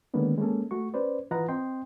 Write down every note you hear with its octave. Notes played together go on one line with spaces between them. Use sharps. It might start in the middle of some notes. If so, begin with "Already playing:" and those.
D3 D#3 G#3 A#3 B3 C#4
G#3 A#3 C#4 A4
A3 F#4 C#6
C#4 B4 C5 D5
E3 F4 B4 D#5 F#5 A#5
C4 D#5 G5 C6